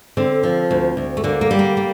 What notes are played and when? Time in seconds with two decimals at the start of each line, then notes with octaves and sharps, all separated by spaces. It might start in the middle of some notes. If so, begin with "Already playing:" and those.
0.17 D3 C4
0.43 F3
0.71 D2
0.97 D2
1.17 A3
1.24 D3 A#3
1.41 A#3
1.51 G3
1.59 A#3
1.77 A#3